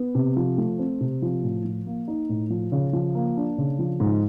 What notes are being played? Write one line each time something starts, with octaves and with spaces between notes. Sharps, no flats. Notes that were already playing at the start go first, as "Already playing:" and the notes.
Already playing: B3
C3
F3
A3
C4
C3
F3
A2
F3
A#3
D#4
A2
F3
C#3
F3
A#3
D4
C#3
F3
G#2